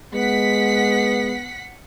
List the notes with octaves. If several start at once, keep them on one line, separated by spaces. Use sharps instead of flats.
G#3 B3 F#5 B6